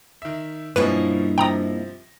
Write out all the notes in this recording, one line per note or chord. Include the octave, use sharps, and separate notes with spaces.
D#3 E5
G2 B2 F3 A#3 C#4 E4 B4 D#5
C3 F3 G5 A#5 D#6 A#6